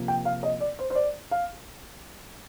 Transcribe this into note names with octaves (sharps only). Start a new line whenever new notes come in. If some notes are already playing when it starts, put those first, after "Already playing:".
Already playing: C3 F3 A#3
G5
F5
D#5
D5
C5
C5
D5
F5